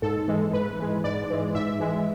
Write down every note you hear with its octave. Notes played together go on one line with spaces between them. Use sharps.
G#2 A4
E3 G#3
G#2 B4
E3 G#3
G#2 D5
E3 G#3
G#2 E5
E3 G#3